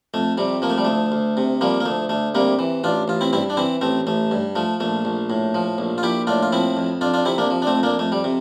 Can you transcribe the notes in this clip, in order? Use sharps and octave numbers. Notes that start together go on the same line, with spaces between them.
F2 A3
C3 G3
F3 A#3
A3
G3
D2 A3
D2
C3
F3 G3 A#3
A#3
D2 A3
D2 A3
C3 G3 A#3
E3
A1 D4 F4
A1 F4
C4 E4
G2 C4 E4
D4
E3 C4 E4
A1 A3 C4
A1 A3
G2
F3 A3
A#1 A3
A#1
A2
F3
A#1
F4
A#1 E4 G4
A2 D4 F4
F4
F3 C4 E4
F2
F2 D4 F4
D4 F4
C3 C4 E4
A#3 D4
F3
D4
A3 C4
F2
A#3 D4
F2 A3
G3
C3